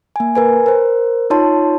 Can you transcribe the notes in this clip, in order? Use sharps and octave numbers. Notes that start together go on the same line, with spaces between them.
A#3 G#5
A#4 B4 G#5
A#4 C5
D#4 F4 C#5 A5 C6